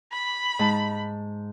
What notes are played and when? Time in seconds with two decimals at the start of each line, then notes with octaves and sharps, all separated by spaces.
0.12 B5
0.59 G#2 A5